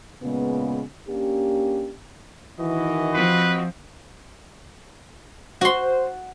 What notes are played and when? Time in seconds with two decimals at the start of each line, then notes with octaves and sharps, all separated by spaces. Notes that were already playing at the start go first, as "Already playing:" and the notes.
0.22 A#2 C#3 G#3 B3
1.08 A#3 C#4 D4 G4
2.59 D#3 E3 F#4 D#5
3.14 F3 C4 B4
5.61 F#4 C5 C6